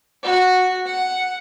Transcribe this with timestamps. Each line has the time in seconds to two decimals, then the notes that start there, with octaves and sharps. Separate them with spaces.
0.23 F#4
0.85 F#5